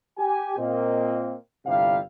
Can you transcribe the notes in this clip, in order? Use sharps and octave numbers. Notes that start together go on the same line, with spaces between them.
G4 G#5
A#2 A#3 C4 D#5
G1 C3 G3 E4 F5